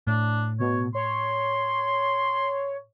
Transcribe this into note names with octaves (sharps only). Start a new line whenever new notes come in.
A2 D4
B2 C#5
C#5 C6